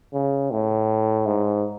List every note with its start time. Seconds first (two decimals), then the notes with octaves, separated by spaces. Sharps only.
0.13 C#3
0.51 A2
1.26 G#2